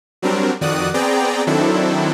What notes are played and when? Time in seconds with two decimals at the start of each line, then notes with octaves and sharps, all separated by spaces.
0.22 F#3 G3 C4 D4 A#4
0.61 F2 D#3 F#4 D5 D#6 F#6
0.94 B3 C4 G#4 D5 G5 A#5
1.47 D#3 F#3 C4 D4 E4 A4